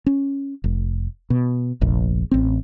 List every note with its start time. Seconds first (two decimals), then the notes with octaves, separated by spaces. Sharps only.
0.06 C#4
0.64 F1
1.30 B2
1.81 F1 A#1
2.31 A1 C4